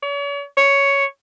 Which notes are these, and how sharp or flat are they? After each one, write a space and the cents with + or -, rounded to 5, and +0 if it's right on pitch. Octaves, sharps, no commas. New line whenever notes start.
C#5 +40
C#5 +5